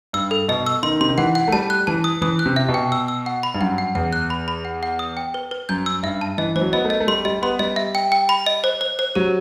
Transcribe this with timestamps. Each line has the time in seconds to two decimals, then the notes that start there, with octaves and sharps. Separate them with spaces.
0.13 G2 E6
0.31 A4
0.48 B2 D#5
0.66 E6
0.83 D#3 C6
1.01 C3 C6
1.09 D#3
1.18 E3 F#5
1.35 F#5
1.48 A3
1.52 G3 A5
1.70 F#6
1.87 E3 A5
2.04 D#6
2.22 E3 D#6
2.39 F#6
2.46 C3
2.56 E5
2.69 B2
2.74 G5
2.92 E6
3.08 E6
3.26 F#5
3.43 B5
3.54 G2
3.61 F#2 F#5
3.78 F#5
3.95 E2 F#5
4.13 F#6
4.30 B5
4.48 B5
4.65 F#5
4.83 F#5
4.99 D#6
5.17 G5
5.34 B4
5.51 B4
5.69 F#2 G6
5.86 E6
6.03 G2 E5
6.21 A5
6.38 E3 D#5
6.56 E3 C5
6.61 F#3
6.73 B3 D#5
6.85 A3
6.90 D#5
7.01 A3
7.07 G3 C6
7.25 G3 D#5
7.42 B3 C6
7.59 G3 D#5
7.76 E5
7.95 G5
8.12 G5
8.29 B5
8.46 D#5
8.64 C5
8.81 C5
8.99 C5
9.15 F#3 G4